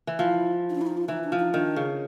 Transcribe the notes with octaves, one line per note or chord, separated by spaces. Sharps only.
E3
F3 E4
D#4
D4
E4
D#4
F4
E3 D#4
D4
F3
D#4
D#3 D4
C#3